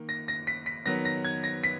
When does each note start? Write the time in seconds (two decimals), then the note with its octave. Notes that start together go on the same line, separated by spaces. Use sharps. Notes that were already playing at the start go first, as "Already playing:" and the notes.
Already playing: D#3 A#3
0.09 A#6
0.28 A#6
0.47 B6
0.66 B6
0.86 D#3 F#3 B3 A#6
1.05 A#6
1.25 G#6
1.44 A#6
1.64 B6